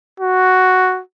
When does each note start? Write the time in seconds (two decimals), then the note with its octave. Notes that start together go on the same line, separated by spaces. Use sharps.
0.21 F#4